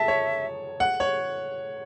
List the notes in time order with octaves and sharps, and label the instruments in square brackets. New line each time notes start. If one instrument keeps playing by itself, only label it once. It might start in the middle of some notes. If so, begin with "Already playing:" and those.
Already playing: [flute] E5 [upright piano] A5
[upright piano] C#5
F#5
C#5